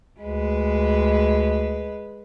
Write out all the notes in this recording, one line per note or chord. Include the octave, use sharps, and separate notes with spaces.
D2 G#3 B4